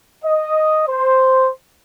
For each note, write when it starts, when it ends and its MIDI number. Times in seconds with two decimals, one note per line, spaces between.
0.24 0.83 75
0.88 1.49 72